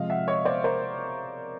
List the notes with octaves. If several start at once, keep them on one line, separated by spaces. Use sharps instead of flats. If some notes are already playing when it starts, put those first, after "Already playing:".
Already playing: C3 F3 G#3 D#5 F5
E5 F#5
C#5 D#5
C5 D5
A#4 C5